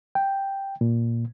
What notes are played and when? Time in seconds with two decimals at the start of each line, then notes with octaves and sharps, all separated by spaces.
0.15 G5
0.81 A#2